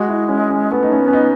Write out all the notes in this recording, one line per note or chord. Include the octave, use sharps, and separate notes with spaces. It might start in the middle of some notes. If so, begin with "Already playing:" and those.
Already playing: G#3 F#4
E4
C#4
C#4
A3 B3
D#4
C#4
B3
C#4
D#4